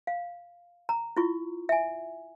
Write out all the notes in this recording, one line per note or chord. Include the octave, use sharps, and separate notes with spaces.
F5
A#5
E4 F4 C#6
E5 G#5